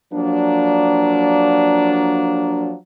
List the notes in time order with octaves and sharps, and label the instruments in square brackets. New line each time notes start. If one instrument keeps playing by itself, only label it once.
[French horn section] F3 F#3 A#3 D4